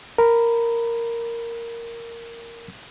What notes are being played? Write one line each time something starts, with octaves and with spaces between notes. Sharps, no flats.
A#4 B5